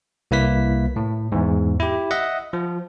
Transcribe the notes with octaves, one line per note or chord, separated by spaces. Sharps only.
C2 A#3 E4 B4 B6
A2
E2 G#2
E4 G4
D#5 E5 F#5
F3